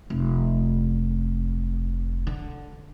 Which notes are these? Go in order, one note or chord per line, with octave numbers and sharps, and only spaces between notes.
F1
D3